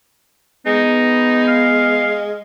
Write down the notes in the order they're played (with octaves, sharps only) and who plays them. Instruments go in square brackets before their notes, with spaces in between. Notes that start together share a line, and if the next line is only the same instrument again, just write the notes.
[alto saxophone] G#3 [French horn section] B3 [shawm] D#4
[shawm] F5